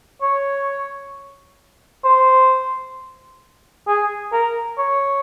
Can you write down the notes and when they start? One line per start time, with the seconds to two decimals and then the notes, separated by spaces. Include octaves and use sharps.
0.22 C#5
2.04 C5
3.87 G#4
4.33 A#4
4.78 C#5